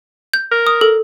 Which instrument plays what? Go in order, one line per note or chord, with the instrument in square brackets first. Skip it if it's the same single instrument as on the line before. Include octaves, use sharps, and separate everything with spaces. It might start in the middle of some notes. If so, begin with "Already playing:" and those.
[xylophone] G6
[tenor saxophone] A#4
[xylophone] D#6
A4